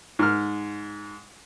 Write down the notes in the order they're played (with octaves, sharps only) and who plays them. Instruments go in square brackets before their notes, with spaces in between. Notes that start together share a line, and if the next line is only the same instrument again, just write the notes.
[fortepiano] G#2 F6